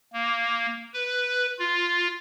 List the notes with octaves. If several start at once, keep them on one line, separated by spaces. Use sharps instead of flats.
A#3
B4
F4